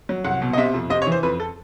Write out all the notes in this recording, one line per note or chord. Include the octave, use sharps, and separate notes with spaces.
F#3
C2 F#5
B2
D#5
C3 E5
F2
C3 D#5
C#5
E3
C5
F2 B4
A4